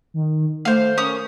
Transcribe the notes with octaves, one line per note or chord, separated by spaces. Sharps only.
D#3
A3 C5 F5
C#4 A#4 D#6